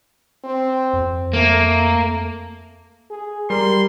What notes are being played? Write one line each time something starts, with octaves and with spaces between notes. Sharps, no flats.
C4
F2
A3 A#3
G#4
G3 A#4 C6